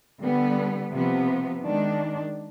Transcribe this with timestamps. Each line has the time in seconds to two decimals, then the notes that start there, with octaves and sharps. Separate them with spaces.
0.23 D3 G3 B3
0.93 C3 F3 B3
1.62 D#3 G#3 D4